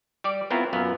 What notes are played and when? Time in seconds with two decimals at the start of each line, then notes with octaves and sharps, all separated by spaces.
0.24 G3 G4 D5
0.50 B3 C4 E4 F4 A#4 C#5
0.73 F#2 A#2 B3 F5